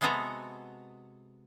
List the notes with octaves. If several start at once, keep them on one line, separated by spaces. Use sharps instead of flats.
C3 G#3 B3 F#4 A4 A#5